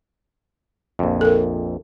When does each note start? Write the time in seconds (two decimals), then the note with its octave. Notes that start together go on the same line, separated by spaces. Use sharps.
0.99 A#1 F2
1.21 A4 A#4